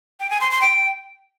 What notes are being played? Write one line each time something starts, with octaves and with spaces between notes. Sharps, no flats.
G5
G#5
C6
C6
G5